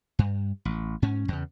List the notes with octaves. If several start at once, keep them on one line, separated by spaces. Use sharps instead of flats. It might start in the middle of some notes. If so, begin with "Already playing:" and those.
G2
A1
G#2 C#4
E2 C#3